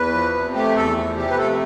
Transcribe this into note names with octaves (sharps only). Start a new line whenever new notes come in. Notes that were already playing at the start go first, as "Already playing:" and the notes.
Already playing: E2 B4
F3
C3
A3 G4
E2 A4
F3
C3 G4
B4
A3 A4